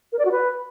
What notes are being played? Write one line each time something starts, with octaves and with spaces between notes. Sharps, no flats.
A#4
D5
F#4
B4